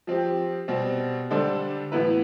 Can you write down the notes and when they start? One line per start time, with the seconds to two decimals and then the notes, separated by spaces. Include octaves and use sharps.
0.07 F3 C4 G4
0.68 B2 G3 C4
1.30 D3 G3 D4 A4 C5
1.92 A2 E3 B3 E4 B4